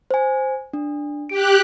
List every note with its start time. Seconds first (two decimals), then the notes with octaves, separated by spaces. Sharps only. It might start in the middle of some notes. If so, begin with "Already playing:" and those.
0.11 C5 G#5
0.73 D4
1.29 G4 F#6 D7